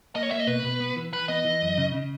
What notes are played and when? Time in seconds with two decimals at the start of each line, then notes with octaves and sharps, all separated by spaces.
0.15 A#3 D#5
0.23 C#5
0.31 A#3 E5
0.40 D#5
0.47 B2 B4
0.63 B2
0.80 B3
0.96 E3
1.13 E3 B4
1.28 B3 D#5
1.45 E3
1.62 F#2
1.78 C#3
1.94 C#3